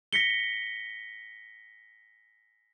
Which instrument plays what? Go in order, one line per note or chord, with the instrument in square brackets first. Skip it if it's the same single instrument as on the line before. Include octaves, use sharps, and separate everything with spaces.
[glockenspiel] A#6 B6 C#7 G7